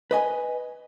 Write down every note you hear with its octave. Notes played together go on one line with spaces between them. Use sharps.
B4 D#5 G#5